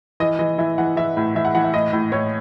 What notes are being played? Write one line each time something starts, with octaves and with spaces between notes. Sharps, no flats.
E3 D#5
E3 D#5
E3 E5
E3 F#5
E3 E5
A2
E3 E5
F#5
E3 F#5
E5
A2 D#5
A2
A2 C#5